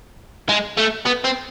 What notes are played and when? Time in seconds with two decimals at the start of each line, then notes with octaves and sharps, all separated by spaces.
0.49 G#3
0.77 A3
1.05 B3
1.24 C4